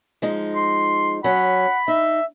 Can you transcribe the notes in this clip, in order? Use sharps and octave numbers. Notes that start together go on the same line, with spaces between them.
F3 G#3 D#4
C6
F#3 C#4 F#5 B5
D#4 E5